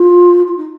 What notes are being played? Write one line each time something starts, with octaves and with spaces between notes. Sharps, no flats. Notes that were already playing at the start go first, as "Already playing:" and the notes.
Already playing: F4
F4
D#4